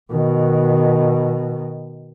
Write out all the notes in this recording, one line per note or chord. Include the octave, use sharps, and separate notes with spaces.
B2 D#3